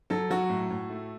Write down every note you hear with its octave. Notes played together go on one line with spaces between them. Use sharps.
F#3 A4
F#3 F#4
A2
A2
A3